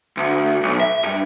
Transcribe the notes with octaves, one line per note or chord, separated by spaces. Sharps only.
D2
B1
E5
G2